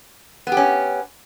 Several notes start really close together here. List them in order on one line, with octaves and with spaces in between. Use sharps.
B3 G4 C#4